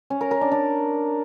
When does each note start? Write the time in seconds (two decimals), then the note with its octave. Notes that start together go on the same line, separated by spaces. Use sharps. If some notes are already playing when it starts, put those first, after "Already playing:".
0.10 C#4
0.21 A#4
0.31 A#4
0.41 D4
0.52 D4